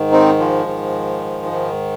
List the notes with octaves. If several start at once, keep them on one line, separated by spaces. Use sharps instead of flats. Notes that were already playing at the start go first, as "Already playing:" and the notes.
Already playing: G#2 D#3
C4 D#4
F3 G#3
G#2 D#3
G#2 D#3